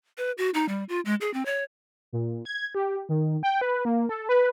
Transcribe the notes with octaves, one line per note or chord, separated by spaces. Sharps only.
B4
F#4
D#4
G3
F4
G#3
G#4
C4
C#5
A#2
G#6
G4
D#3
G5
B4
A#3
A4
B4